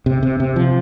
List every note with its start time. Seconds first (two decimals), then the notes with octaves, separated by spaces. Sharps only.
0.06 C3
0.23 C3
0.40 C3
0.56 F3